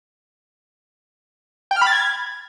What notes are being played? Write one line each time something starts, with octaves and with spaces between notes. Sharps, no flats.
G5
F6
B5
A6
G#6